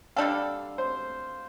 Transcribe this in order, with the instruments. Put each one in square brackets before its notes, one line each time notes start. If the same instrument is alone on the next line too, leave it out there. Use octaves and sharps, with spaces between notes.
[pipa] D3 G3 D4 A4 [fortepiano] F5
[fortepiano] C5